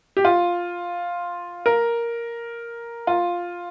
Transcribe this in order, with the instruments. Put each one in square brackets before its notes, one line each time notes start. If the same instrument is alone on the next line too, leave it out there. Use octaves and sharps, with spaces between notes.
[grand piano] G4
F4
A#4
F4